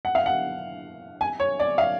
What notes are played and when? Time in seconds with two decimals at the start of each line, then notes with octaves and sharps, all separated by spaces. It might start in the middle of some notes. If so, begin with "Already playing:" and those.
0.05 F#5
0.15 F5
0.26 F#5
1.21 G#5
1.40 C#5
1.60 D5
1.78 F5